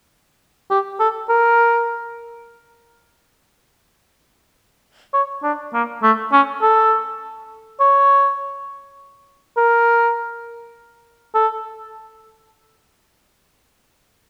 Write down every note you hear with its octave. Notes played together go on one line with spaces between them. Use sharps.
G4
A4
A#4
C#5
D4
A#3
A3
C#4
A4
C#5
A#4
A4